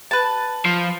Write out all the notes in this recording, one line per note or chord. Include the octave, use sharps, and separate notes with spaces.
B4 A5
F3